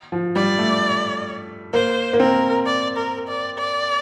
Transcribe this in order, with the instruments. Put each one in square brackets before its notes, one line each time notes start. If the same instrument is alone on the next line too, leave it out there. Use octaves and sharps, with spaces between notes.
[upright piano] F3
[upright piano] G3 [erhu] D5
[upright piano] A3
[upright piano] A#3 [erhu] C5
[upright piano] A#3
[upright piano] C4 [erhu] A#4
[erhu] D5
A#4
D5
D5